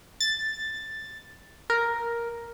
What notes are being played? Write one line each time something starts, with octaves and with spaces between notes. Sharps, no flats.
A6
A#4